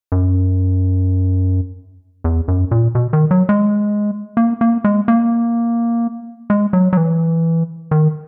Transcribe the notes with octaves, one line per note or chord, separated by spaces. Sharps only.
F#2
E2
F#2
A#2
B2
D#3
F#3
G#3
A#3
A#3
G#3
A#3
G#3
F#3
F#3
E3
D#3